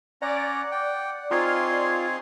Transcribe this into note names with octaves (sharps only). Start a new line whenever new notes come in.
C#4 D5 F#5 A#5
G5
C4 D#4 F4 G#4 C#5 C6